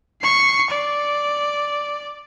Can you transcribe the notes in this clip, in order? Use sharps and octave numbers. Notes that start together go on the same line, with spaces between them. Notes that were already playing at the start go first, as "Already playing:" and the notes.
C#6 C7
D5